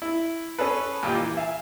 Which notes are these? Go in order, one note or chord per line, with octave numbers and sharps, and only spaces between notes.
E4
C#4 G#4 A4 B4
D#2 A#2 F4 G4 G5
E3
E5 F5 G#5